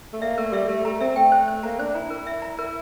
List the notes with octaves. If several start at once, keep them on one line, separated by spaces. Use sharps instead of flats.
A3
A#3 E5
A3 A#4
G3 E5
A3 A#4
A3 A#5
C4 E5
A3 G5
C5
C5
A#3 A#5
D4 C5
E4 A#5
A#4
E5
A#5
A#4